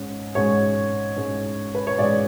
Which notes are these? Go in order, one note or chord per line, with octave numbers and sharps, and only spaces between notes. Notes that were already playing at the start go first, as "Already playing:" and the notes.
Already playing: G#2 G#3 C#4
G#2 G#3 C#4 C#5
G#2 G#3 C#4
B4
C#5
G#2 G#3 C#4 D5